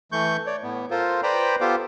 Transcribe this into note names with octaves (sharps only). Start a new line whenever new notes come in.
E3 A3 C#6 G6
C#5 D5
A2 B3
F4 A4 A#4 C5
B4 C5 D5 G5 A#5 B5
B3 F4 G4 A4 C5 D6